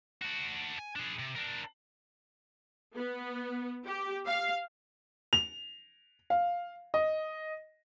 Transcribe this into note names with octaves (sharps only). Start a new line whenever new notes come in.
D4 F#4
G#5
D4 G#4
C3
D4 A#4
B3
G4
F5
F7
F5
D#5